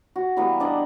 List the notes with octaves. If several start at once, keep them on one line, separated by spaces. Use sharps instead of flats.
F#4
E3 G3 A#3 B3
D4 D5 D#5 A5